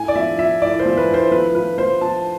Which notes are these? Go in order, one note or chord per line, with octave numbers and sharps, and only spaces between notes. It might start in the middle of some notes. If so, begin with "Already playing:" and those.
Already playing: A2 G#5
D5
F3 E5
F3 E5
A2 D5
C5
F3
B4
A2
C5
F3 B4
F3 B4
F3 C5
F3 A5